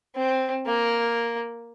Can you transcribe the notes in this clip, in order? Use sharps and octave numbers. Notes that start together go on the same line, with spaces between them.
C4
A#3